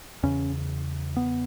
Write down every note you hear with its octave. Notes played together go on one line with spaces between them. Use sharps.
E2 C#3 C#4
B3